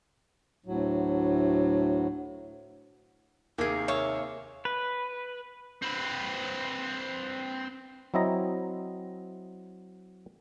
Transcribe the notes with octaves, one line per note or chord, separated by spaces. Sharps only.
D2 A2 F#3
D#2 C3 D#3 A#3 G#4
C#5 E5 F5
B4
C4 B4
F#3 C4 E4 D#5 A#5